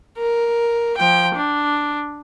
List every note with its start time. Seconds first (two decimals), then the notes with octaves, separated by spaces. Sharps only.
0.18 A#4
0.97 F3 G5
1.35 D4